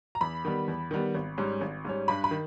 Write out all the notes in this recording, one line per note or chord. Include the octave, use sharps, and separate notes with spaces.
A#5
E2 B5
D#3 G3 B3
E2
D#3 G3 B3
G#1
G#2 G3 C#4
G#1
G#2 G3 C#4
G2 B5
B5
D#3